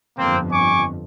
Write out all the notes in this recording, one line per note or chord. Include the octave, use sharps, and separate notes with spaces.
G1 F2 A#3 C4
G#5 C#6 D6